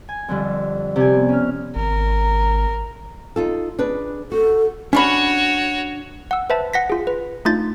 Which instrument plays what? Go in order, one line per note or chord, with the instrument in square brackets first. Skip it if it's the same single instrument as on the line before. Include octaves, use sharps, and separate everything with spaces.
[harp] G#5
F2 D3 G3
[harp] C3 D5 G#5 [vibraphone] G4
[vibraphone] B3
[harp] C#4 F6
[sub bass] G#1 [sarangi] A#4
[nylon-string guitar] D#4 F4 A4
D4 G#4 B4
[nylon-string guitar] F#4 [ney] A4
[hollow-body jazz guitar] C#4 D4 B5 [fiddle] F#4 C#5
[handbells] F#5 E6
B4 C5 E5 A5
F#5 A#6 B6
F4 G#4
B4
A3 D4 D#4 F4 G6 A6